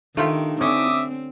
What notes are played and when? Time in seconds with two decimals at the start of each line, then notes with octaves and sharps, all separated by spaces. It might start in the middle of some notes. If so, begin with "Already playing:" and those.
0.17 D#3 A3 D4 D#4 F4 G4
0.61 D3 C4 C#4 E5 D6 D#6